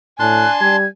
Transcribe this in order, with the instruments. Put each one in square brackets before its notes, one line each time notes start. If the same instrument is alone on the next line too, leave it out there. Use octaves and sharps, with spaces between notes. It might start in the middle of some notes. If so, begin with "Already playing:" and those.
[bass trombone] A2 [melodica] D4 A5 C6 [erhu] G#5 [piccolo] F#6
[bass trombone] G3 [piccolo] G#6